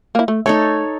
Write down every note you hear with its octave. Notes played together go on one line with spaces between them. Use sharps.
A#3 E4
A3
A3 D#4 A4 C#5